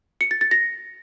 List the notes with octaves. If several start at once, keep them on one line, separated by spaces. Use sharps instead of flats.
C#7
A6
A6
A#6